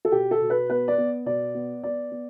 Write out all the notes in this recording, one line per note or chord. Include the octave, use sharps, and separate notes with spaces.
A4
B2 G4
A4
B2
B4
B3 B4
D5
B3
B2 D5
B3
B3 D5
B3